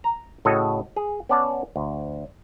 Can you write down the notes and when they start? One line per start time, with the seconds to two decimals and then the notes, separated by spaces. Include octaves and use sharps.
0.04 A#5
0.45 A2 C#3 F#4 A4 C#5 D#5
0.96 G#4
1.29 B3 C#4 D5 F#5 A5
1.76 D2